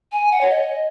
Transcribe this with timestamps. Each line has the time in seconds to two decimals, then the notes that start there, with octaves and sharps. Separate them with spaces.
0.12 G#5
0.31 F#5
0.41 C#5
0.50 D#5